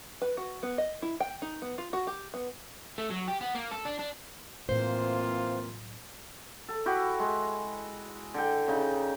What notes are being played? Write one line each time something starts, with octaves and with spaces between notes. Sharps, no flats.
B4
F#4
B3
D#5
E4
G5
D#4
B3
F4
F#4
G4
B3
A3
F#3
G4
B3
A#3
A4
D4
D4
A2 E3 F#3 A#3 C4 F4 C5
A4
E4 F#4 G4
G#3
D3 G5
C#3 D#4